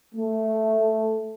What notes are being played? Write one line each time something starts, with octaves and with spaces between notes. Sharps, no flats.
A3